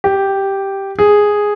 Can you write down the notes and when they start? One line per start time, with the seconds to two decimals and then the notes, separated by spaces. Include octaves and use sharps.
0.04 G4
0.99 G#4